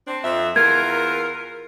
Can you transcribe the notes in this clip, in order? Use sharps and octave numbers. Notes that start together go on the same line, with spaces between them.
C4 D4
F2 E5
E2 F4 A#4 G#6